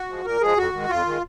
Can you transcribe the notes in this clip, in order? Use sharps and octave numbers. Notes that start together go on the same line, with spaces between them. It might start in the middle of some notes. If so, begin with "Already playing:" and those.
Already playing: F#4
F3 G#3
A#2 A#4
F3 G#3 G#4
F2 F#4
D#3 G#3
F2 F4
D#3 G#3